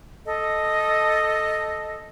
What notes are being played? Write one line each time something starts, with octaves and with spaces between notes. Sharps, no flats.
A4 D#5